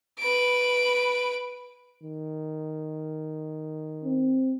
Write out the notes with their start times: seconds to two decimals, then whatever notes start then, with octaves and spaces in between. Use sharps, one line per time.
0.19 B4 D7
2.04 D#3
4.04 C4